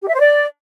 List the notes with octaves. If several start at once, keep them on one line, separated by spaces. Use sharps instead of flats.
G4
E5
C5
D5